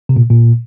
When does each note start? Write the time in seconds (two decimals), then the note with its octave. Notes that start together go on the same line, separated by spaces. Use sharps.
0.09 C3
0.16 A#2
0.30 A#2